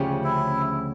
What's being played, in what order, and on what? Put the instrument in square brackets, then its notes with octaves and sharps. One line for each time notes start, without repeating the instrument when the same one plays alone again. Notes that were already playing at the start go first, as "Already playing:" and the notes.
Already playing: [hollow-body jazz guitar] D2 C#3 F3 C#4 G4
[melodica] E4